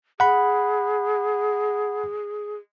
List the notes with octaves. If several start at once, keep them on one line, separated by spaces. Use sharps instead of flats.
G#4 F#5 B5